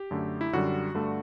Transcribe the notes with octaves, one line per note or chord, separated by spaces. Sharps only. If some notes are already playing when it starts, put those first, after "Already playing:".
Already playing: G4
F#2 D3 A3
E4
F#2 D3 G3 F#4
G2 D3 A3